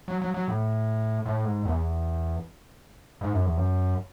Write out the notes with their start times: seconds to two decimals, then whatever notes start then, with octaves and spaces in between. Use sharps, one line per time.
0.08 F#3
0.22 F#3
0.34 F#3
0.48 A2
1.26 A2
1.45 G#2
1.65 E2
3.21 G#2
3.33 F#2
3.46 E2
3.57 F#2